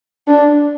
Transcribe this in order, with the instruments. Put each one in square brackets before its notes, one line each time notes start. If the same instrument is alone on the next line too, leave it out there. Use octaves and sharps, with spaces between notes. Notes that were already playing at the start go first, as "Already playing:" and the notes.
[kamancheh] D4